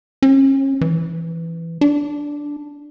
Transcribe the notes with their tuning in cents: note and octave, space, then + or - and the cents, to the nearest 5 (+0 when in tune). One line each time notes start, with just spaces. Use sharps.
C#4 -35
E3 +10
D4 -5